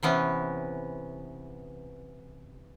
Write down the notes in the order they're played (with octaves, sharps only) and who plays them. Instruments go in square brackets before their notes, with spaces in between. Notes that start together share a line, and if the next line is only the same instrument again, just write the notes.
[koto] C3 E3 B3 C#4